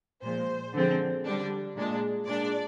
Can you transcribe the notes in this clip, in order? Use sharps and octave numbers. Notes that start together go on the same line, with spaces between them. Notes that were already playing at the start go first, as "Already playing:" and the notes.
A#2 F3 G#3 C5
D3 F3 G#3 C4
D3 G3 D4
A#2 G#3 D4
A#2 G#3 D4 D5